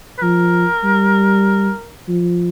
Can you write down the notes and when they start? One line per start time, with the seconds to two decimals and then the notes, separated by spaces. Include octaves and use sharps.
0.18 B4
0.22 F3 A#4
0.84 G3
2.08 F3